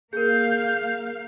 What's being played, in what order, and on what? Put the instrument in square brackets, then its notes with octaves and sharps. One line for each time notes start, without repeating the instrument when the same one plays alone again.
[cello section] A#3 F5 [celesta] G#4 A#4 [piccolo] G6